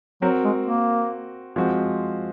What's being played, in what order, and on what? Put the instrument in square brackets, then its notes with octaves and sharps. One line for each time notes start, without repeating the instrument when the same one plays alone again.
[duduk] F#3 [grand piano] C4 F#4 A#4
[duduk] G#3
A#3
[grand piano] F3 G#3 C4 F#4